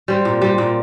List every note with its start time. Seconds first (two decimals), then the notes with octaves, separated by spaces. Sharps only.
0.08 G3 C4
0.25 A#2
0.42 G3 C4
0.58 A#2